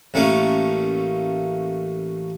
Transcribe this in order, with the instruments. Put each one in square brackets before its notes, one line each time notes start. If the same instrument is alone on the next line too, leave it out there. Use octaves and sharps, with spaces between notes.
[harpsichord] A1 A3 A#3 C#4 F5